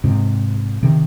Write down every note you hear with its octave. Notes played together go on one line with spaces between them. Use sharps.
G#2 C3
C3 D#3